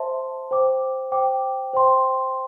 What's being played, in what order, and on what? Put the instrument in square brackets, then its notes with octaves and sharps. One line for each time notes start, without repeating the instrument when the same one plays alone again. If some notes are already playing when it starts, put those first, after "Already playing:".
Already playing: [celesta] C5 E5 A5 C6
C5 G5 D6
C5 G5 D6
C5 G5 C6